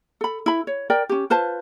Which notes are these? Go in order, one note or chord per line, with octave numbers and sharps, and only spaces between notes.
A4 B5
E4 B5
C#5
A#4 D5 G5
C#4 G4
F4 B4 C5 A5